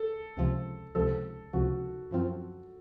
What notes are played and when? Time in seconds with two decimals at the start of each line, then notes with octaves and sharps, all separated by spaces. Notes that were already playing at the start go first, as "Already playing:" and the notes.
Already playing: A4
0.37 C#2 C3 F3
0.95 C#2 C3 F3 A4
1.53 C#2 C3 F3 F#4
2.11 F#2 F3 C4 F4